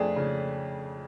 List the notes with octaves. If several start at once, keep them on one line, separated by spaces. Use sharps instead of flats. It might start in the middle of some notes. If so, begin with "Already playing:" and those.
Already playing: F2 A3 D4 G#4
C#3